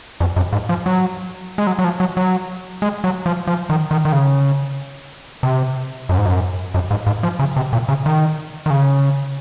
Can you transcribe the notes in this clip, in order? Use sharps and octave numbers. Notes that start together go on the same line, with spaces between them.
F2
F#2
G#2
F3
F#3
G#3
F#3
F#3
F3
F#3
F#3
G#3
F#3
F3
F3
D#3
D#3
D#3
C#3
C3
F#2
G#2
F#2
F#2
G#2
G#2
F3
C#3
C3
A#2
C#3
D#3
D#3
C#3